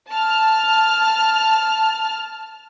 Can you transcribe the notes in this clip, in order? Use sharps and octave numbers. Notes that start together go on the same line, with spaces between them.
A5 F6